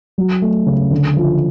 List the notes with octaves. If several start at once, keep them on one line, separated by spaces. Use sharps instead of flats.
F#3
A3
C#3
D3
F3